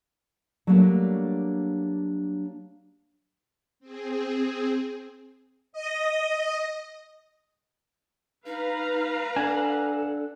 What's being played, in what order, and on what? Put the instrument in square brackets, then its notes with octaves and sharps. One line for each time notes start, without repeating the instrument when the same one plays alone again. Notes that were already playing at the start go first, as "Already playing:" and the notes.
[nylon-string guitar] F#3 G3 A3 A#3 D4
[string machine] C4 G#4
D#5
[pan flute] D#4 [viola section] B4 F5 A#5
[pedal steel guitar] D4 F#5 [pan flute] A4 [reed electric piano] G#5